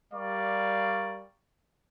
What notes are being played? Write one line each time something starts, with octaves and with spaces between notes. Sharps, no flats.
G3 A#4 D5 F5 C#6